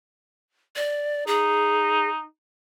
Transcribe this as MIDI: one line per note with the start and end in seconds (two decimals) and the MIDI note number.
0.76 1.24 74
1.27 2.24 63
1.27 2.09 68